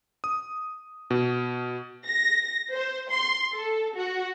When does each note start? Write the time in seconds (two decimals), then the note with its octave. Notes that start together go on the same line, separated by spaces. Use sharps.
0.24 D#6
1.10 B2
2.06 A#6
2.72 C5
3.11 C6
3.52 A4
3.96 F#4